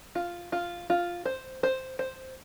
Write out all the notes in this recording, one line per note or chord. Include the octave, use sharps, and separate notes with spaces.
F4
F4
F4
C5
C5
C5